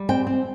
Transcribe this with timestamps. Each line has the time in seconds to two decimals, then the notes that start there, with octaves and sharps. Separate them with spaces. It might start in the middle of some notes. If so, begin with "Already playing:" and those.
Already playing: G3
0.09 C4 G5
0.27 C4